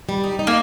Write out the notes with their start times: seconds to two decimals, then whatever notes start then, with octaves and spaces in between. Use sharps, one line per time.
0.09 G3
0.24 D#4
0.39 D#4
0.47 A#3